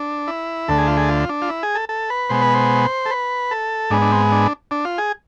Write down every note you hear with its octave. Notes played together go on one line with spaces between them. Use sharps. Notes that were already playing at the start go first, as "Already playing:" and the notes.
Already playing: D4
E4
D2 D3 A3 A4
G#4
F4
G#4
F4
D4
F4
E4
G#4
A4
A4
B4
B2 G#3 B3 C5
B4
C5
A4
B4
A4
G#2 G#3 B3 D4
D4
C4
D4
D4
F4
G#4